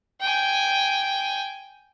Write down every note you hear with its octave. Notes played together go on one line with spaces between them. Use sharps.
G5 G#5